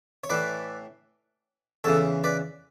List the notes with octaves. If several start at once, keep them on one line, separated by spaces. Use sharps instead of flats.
C#5
A2 E3 B4 D5
E2 C#3 E3 A4 C#5
B4 D5